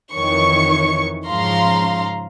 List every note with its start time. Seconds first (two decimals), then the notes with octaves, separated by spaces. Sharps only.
0.13 F2 D#3 E3 C#5 C#6 C#7
1.27 G#2 C#3 F3 F5 A#5 C6